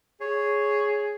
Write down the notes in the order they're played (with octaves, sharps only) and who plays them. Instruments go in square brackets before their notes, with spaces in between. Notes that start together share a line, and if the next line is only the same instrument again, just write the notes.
[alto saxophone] G#4 [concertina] C#5